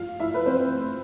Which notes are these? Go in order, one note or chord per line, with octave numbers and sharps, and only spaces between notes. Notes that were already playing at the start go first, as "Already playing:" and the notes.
Already playing: F4 F5
E4 E5
B4
C4 C5